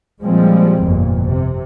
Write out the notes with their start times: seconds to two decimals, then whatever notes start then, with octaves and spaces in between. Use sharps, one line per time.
0.23 A#2 F3 G3 G#3 C4
0.82 G1 F2 A#2
1.26 C3